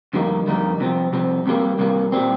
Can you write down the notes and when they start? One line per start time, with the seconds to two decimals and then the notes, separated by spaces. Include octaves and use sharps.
0.13 F2 D3 G3 A#3 D#4
0.47 F2 D3 G3 A#3 D#4
0.80 C2 C3 F3 C4
1.13 C2 C3 F3 C4
1.46 C2 C3 G3 A#3
1.79 C2 C3 G3 A#3
2.12 A#2 G3 C4